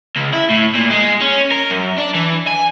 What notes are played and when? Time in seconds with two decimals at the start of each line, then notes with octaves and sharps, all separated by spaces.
0.16 C#2
0.33 E4
0.50 A2
0.75 A#2
0.90 G#3
1.21 C#4
1.52 A#4
1.70 F#2
1.98 D4
2.15 E3
2.47 G#5